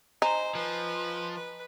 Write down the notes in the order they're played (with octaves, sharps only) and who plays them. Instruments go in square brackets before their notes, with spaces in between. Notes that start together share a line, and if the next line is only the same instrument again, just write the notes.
[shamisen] D#4 [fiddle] C5 [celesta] D#5 G#5 A#5
[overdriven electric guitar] F3 [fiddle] B4
[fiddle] B4